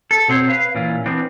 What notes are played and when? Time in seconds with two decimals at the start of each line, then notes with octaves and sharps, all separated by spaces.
0.11 A4
0.28 B2 C4 C5 C#5
0.48 B4 F5
0.75 A#2 E3 C#4 F4
1.06 E3 B3 C4 D4